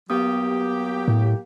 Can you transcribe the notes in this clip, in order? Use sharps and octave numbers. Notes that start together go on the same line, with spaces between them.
F#3 A#3 B3 G4 D#6
A2